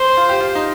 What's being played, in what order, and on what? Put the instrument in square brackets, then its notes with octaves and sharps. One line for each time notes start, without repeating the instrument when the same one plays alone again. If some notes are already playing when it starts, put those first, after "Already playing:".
Already playing: [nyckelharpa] C5
[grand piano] F4
G4
F4
D#4